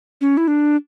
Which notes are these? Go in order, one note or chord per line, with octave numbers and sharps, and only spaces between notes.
C#4
E4
D4